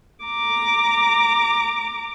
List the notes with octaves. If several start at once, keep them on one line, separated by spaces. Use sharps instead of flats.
A#5 D6